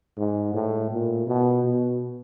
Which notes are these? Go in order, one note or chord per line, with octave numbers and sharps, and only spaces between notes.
G#2
A2
A#2
B2
B2